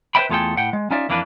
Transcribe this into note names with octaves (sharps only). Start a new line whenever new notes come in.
B4 C5 D#5 E5 G5 B5
E2 A3 F4 G#4 A4 G5
A2 F#5 G5
G#3
C#4 D#4 F4 D5 E5
F2 E3 A#3 D4 G#4 B4